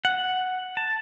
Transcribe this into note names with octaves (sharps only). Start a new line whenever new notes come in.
F#5
A5